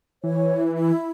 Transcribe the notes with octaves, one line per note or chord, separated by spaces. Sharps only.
E3 C#5
E4
E4